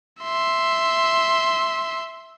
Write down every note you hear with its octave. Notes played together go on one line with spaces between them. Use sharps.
E5 C6